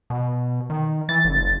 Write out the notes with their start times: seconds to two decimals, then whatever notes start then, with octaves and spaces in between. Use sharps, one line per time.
0.10 B2
0.70 D#3
1.09 E3 A6
1.24 F#1